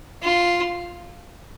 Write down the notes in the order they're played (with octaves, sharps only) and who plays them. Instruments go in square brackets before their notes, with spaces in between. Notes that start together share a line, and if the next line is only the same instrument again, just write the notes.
[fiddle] F4